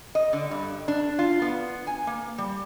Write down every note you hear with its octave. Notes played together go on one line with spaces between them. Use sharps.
D#5
D3
G2
D4
F4
B3
G#5
A#3
G3